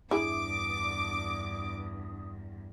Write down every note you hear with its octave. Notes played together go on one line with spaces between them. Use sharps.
E2 G2 D4 E4 G#4 D6 D#6